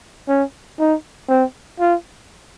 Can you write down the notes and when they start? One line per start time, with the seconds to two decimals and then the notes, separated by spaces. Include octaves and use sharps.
0.28 C#4
0.79 D#4
1.29 C4
1.80 F4